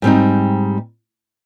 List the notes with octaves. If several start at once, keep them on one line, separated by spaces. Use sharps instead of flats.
G#2 G3 C4 D#4